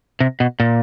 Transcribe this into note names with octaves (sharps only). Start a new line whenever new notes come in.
C3
B2
A#2